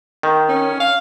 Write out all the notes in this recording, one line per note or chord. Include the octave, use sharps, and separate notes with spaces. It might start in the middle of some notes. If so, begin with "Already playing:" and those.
D#3
C#4
F5